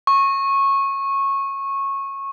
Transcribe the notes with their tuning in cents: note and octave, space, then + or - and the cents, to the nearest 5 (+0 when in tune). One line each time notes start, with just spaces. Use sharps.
C#6 -15